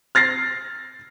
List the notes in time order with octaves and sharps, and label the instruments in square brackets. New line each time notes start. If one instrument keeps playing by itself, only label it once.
[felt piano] F6 A6 A#6 C7